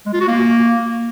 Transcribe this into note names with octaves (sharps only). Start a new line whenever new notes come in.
G#3
F4
F#4
A#3